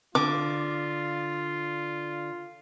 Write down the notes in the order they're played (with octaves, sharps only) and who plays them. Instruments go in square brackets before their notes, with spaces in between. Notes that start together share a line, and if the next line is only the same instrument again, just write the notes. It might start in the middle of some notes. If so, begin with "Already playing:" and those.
[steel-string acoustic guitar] D3 [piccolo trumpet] F4 [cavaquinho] D6